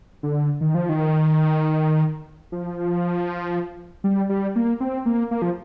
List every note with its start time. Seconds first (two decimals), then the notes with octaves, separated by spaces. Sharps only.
0.23 D3
0.61 D#3
0.75 F3
0.89 D#3
2.52 F3
4.04 G3
4.29 G3
4.56 A#3
4.80 C4
5.06 A#3
5.31 A#3
5.42 F3